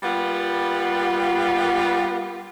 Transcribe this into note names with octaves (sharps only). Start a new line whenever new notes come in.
G3 A#3 B3 F4